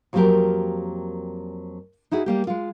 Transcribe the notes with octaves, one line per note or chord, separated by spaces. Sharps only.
F2 F#3 A#3 D#4 G4 A#4
D#4 E4 F#4 G#4
G3 A#3 G4
G#3 F4